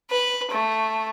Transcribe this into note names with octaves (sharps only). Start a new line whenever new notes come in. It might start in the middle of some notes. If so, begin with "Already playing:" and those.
B4
A3